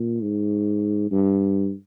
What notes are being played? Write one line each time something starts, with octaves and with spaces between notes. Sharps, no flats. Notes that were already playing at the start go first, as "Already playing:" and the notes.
Already playing: A#2
G#2
G2